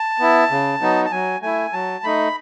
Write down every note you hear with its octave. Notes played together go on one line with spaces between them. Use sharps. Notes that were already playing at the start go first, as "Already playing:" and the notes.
Already playing: A5
B3 E4
C#3
F#3 B3 D#4
A5
F#3 G#5
A3 E4 G#5
F#3 A5
A3 D#4 B5